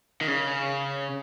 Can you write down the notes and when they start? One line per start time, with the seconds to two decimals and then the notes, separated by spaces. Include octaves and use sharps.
0.21 D#3
0.28 C#3